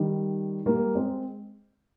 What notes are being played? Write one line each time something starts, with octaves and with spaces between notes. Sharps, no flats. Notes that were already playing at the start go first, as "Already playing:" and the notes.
Already playing: D#3 G3
G3 A#3
G#3 C4